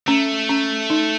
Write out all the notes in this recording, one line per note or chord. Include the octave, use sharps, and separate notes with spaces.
A3 C#4
C#4
D#4